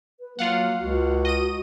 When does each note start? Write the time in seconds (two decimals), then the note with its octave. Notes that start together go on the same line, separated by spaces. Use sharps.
0.20 B4
0.39 F#3 A#3 F4 F5 F#5
0.81 C#2 F#4
1.25 D#5 D#7